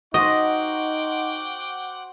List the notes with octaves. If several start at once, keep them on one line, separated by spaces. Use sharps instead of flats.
D#4 F#4 C5 D#5 F#5 G5 D6